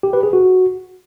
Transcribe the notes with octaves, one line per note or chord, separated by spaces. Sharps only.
G4
B4
G#4
F#4